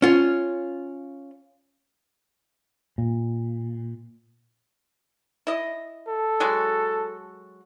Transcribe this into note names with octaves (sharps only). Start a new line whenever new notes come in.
C#4 F4
A#2
E4 D#5
A4
F#3 G#3 F#4